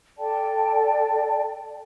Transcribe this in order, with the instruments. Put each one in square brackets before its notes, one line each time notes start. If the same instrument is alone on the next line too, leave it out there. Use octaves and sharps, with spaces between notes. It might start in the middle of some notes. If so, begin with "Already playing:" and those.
[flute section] A4 D5 G5 A5